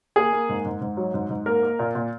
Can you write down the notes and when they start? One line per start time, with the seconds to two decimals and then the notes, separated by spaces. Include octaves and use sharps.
0.16 A#3 G#4
0.33 A#3
0.49 G#2
0.65 G#2
0.81 G#2
0.97 F#3
1.14 G#2
1.30 G#2
1.46 A#3 A#4
1.63 A#3
1.79 A#2
1.95 A#2